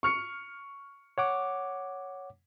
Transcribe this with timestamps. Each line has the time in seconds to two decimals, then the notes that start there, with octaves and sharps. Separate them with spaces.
0.03 C#6 F6 C#7
1.18 C#5 F#5 D6